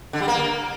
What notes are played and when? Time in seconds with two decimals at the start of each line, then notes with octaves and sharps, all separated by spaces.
0.13 D3
0.21 G3
0.28 A#3